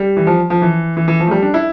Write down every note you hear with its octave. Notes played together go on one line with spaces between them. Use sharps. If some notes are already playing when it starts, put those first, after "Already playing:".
Already playing: G3
E3
F3
F3
E3
E3
E3
F3
A3
G3
D4
E4